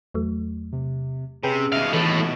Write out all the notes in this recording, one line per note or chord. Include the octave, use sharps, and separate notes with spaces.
E2 F#3 A3
C3
C3 C#4 G#4 B4 G5
D#2 B2 E5 F5
A2 E3 A4 A6